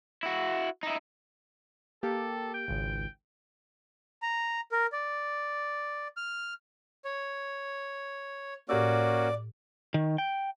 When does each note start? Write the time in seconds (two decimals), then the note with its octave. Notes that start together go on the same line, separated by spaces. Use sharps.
0.23 E4 F#4
0.83 D#4 E4
2.03 A#3 G4 A4
2.54 G5
2.68 G#1 C#2
4.22 A#5
4.72 A#4
4.92 D5
6.17 F6
7.05 C#5
8.69 A2 A#3 C#4 F#4 G4 D5 E6
9.94 D#3
10.18 G5